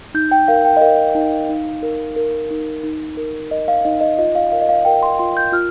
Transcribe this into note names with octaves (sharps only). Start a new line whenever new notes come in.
D#4 G6
G5
A#4 F5
G5
D#5
A#4 F5
D#4
D#4
A#4
A#4
D#4
D#4
A#4
A#4 D#5
F5
D#4 D#5
D#5
F4 D#5
F5
A#4 F5
D#5
F5
A#4 G5
C6
F4 C6
G6
F4 F6